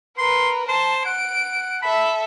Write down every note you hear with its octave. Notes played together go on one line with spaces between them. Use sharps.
A#4 B4 C6
C5 A5
F#5 D7
A4 E5 B5